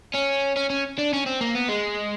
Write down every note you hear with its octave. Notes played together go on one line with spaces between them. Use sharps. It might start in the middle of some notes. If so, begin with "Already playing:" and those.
C#4
C#4
C#4
D4
C#4
C4
A#3
B3
G#3